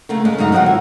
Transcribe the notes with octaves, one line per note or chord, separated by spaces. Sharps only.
C#3 A3 A#3
G#3 C#4
F#2 C#3 D#4 F5
G#2 D#3 F3 F#3 C4 F#5
E4